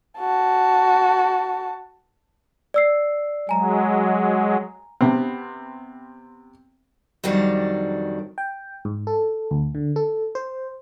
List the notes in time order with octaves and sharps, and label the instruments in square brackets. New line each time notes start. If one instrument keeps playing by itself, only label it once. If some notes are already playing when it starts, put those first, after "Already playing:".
[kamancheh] F#4 A5
[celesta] D5 E6 C7
[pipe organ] F#3 G#3 [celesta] G#5 A#5
[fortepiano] C3 B3 C4
[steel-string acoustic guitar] F2 D#3 F#3 G3 D4
[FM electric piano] G5
G#2
A4
D2
D3
A4
C5